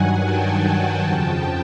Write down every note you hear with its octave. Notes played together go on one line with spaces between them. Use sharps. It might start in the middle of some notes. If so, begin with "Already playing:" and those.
Already playing: G2 D#3 F#3 F#5 G#5
G5 A5
F2 C#3 F3